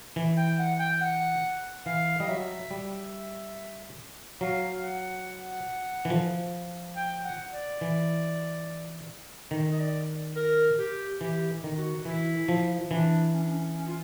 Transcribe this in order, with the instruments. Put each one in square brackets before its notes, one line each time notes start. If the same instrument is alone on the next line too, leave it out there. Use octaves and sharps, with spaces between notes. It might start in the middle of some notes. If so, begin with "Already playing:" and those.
[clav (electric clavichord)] E3
[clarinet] G5
F#5
G5
F#5
[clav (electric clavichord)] E3 [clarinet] F5
[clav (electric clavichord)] G3 [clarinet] D#5
[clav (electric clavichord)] F#3 [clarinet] E5
[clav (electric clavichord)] G3
[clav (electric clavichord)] F#3 [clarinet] F5
[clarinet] F#5
[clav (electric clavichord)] E3
F3
[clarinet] G5
F#5
D5
[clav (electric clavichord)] E3
D#3
[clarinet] D#5
D5
A#4
G4
[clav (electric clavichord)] E3 [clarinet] G4
[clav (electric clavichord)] D#3
[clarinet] F#4
[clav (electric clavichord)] E3 [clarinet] E4
[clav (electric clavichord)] F3
[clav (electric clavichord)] E3 [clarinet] D4
[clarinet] C#4
D4
C#4
C#4
F4